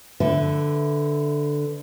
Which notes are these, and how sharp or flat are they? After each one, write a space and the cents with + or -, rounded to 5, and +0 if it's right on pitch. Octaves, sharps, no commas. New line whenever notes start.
D3 +0 B4 +15 E5 +0